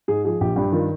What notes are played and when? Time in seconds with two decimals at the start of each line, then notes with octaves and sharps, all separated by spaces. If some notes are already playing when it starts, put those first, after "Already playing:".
0.08 G#2 G#4
0.24 F3 G#4
0.40 A#1 G4
0.56 G2 G4
0.72 D#3 F4